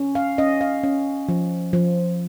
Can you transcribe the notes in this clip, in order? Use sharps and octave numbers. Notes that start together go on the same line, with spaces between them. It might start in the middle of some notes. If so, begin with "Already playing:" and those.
Already playing: C#4
F5
C#4 D#5
F5
C#4
F3
F3